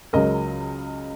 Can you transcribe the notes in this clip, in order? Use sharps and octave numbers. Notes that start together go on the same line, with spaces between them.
C#2 C#3 F#3 A#4 D#5